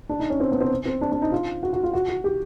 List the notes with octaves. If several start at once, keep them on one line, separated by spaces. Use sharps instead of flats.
D4
D#4
C#4
C4
B3
C4
C4
D4
D4
D#4
F4
F#4
F#4
F4
F#4
F#4
G4